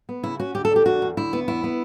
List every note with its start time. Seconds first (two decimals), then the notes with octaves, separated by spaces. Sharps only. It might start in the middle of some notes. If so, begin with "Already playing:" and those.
0.09 B3
0.23 C#3 E4
0.40 C#4 F#4
0.55 D2 G4
0.65 A4
0.70 D4
0.76 G4
0.86 E2 F#4
1.02 E2
1.17 D2 E4
1.33 B3
1.48 E2 E4
1.64 B3